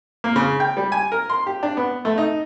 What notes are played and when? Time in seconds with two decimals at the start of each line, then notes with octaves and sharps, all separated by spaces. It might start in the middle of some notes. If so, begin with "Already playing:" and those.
0.24 A#3
0.36 C#3
0.60 G5
0.77 G3
0.92 G#5
1.12 A#4
1.30 C6
1.47 G4
1.63 D4
1.77 B3
2.05 A3
2.18 D#4